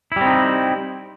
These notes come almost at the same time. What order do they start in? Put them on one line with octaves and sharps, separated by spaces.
E4 G3 C4 D#4